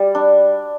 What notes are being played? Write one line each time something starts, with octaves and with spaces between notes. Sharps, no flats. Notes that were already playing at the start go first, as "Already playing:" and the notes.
Already playing: G3 D5
D4